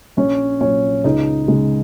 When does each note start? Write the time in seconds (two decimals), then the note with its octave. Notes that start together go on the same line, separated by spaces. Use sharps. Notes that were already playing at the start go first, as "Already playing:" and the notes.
0.17 A#1 C#4 C#5
0.61 A#2 F#3 C#4 C#5
1.04 C#2 D#4 D#5
1.48 C#3 G#3